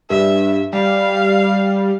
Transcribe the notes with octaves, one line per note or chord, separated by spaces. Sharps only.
G2 E5
G3 F5